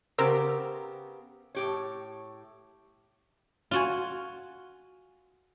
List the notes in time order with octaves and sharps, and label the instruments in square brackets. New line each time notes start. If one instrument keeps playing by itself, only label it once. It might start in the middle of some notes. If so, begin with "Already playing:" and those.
[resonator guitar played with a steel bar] C#3 B3 G4 [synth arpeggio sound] A#4 C5 E6
[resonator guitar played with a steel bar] A2 G4 C#5
[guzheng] F4 F#4 G#5